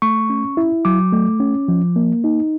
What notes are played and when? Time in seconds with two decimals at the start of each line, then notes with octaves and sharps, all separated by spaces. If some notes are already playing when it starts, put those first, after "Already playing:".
0.02 A3 C#6
0.30 C#4
0.57 E4
0.85 F#3 D6
1.13 A3
1.40 C#4
1.68 F3
1.96 A#3
2.24 D#4